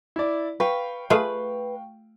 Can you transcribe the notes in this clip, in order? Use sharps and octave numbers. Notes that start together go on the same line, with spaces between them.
E4 D5
B4 F5 G5 C#6
A3 F4 G#4 B4 B5